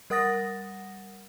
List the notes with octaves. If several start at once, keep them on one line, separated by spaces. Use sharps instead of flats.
G3 A#4 F#5 D#6 A6 A#6